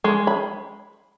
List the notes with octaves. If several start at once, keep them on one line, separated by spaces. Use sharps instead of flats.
G#3
B5